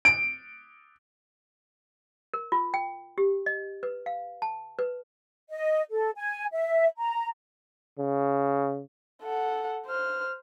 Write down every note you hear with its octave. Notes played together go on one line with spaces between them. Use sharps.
D7
A#4
F4
G5
G4
D#5
B4
F5
A5
B4
D#5
A4
G#5
E5
A#5
C#3
A4 F#5
C5 F6